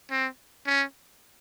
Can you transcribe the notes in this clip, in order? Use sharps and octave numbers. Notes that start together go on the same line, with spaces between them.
C4
C#4